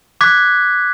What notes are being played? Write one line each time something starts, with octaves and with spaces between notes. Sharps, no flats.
D6 F#6 G#6 B6